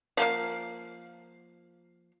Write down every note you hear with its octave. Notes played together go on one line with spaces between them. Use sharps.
F3 A#3 F5